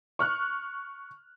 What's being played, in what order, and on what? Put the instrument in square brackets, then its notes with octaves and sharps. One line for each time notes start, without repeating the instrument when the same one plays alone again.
[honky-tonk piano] C#6 F6 F#6